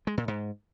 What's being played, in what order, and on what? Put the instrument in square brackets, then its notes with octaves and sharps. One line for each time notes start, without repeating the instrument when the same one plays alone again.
[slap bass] G#3
A#2
G#2